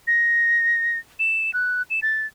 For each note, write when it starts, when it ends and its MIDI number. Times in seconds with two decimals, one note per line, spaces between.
0.07 0.98 94
1.19 1.53 100
1.54 1.82 90
1.90 2.00 100
2.02 2.26 93